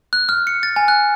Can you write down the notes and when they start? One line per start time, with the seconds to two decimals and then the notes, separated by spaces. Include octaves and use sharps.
0.13 F#6
0.29 F6
0.47 C#7
0.63 A6
0.76 G#5
0.88 F#6